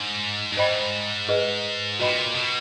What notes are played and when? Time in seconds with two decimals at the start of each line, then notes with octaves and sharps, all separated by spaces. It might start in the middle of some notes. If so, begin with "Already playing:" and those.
Already playing: G#2
0.52 G2
0.57 G#2 C5 D#5 G5 B5
1.29 G#4 B4 D#5
1.99 A#2 F#4 B4 D#5 G5 B5
2.35 B2